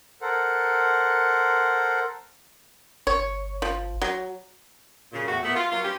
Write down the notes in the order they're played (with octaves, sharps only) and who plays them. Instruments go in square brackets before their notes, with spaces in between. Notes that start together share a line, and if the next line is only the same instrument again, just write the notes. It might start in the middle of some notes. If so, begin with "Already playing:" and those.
[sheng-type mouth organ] A4 A#4 C5 F#5
[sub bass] G1 [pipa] C#5
[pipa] F3
F#3
[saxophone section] F#2 A#2 C#3
E2 A2 F#4
A#2 A3 B3
F4
F#3 A#3 F4
G2 C#4 G4